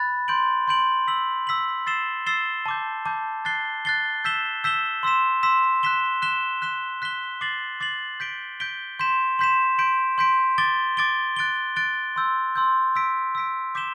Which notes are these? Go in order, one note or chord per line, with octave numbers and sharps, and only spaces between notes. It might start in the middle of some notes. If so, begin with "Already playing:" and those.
Already playing: B5 F#6 A6
C6 G6 D7 F#7
C6 G6 D7 F#7
E6 B6 F#7
E6 B6 F#7
E6 A6 C7 E7 G7
E6 A6 C7 E7 G7
A5 D6 G6
A5 D6 G6
F#6 A6 C7 G7
F#6 A6 C7 G7
E6 G6 B6 E7 G7
E6 G6 B6 E7 G7
C6 E6 B6 E7
C6 E6 B6 E7
F#6 B6 E7 G7
F#6 B6 E7 G7
F#6 B6 E7 G7
F#6 B6 E7 G7
D6 A6 C7 F#7
D6 A6 C7 F#7
G6 B6 D7 G7
G6 B6 D7 G7
C6 G6 B6 E7
C6 G6 B6 E7
C6 G6 B6 D7
C6 G6 B6 D7
D6 A6 D7 G7
D6 A6 D7 G7
F#6 A6 D7 G7
F#6 A6 D7 G7
C6 E6 G6
C6 E6 G6
E6 B6 D7
E6 B6 D7
D6 G6 B6 E7 G7